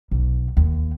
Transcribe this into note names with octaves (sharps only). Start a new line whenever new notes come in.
B1
D#2